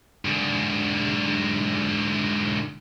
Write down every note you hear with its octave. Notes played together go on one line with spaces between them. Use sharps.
G#2 D3